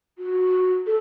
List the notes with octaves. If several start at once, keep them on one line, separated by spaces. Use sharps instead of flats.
F#4
A4